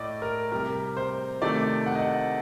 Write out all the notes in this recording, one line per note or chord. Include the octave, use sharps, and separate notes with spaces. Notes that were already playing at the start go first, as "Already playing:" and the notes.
Already playing: A2 A3 D5 D#5
A#4
C3 G3 A#4
C5
C3 D#3 A3 D5
F#5
D#5
F#5